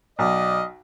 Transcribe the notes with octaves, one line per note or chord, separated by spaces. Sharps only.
B1 D5 D#5